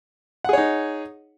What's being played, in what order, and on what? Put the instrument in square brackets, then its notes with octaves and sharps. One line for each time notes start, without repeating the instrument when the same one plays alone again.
[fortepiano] F#5
G#4
C#5
D#4